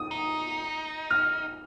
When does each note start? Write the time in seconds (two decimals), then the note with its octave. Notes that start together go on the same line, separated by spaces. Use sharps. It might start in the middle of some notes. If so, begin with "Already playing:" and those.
Already playing: D#6
0.11 D#4
1.11 F6